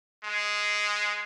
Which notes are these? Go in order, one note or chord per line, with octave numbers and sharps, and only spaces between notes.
G#3